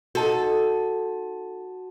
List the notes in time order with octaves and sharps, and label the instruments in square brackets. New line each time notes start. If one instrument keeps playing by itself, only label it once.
[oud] D#4 A4 [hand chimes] F#4 A5